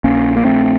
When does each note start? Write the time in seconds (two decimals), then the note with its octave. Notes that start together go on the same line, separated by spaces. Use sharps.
0.04 A#1 A#3 C#4
0.37 A#3
0.45 A#1 A3 C4